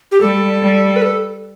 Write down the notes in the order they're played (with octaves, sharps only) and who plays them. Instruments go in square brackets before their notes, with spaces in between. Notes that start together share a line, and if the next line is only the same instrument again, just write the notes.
[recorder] G4
[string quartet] G3 [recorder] A4
[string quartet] G3
[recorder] B4
A4